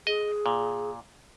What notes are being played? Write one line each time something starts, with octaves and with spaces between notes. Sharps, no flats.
G#4 D#5
A#2